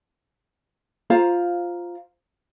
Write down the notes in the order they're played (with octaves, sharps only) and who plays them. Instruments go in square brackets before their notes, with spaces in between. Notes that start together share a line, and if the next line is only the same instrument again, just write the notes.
[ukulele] F4 C5 F5 A#5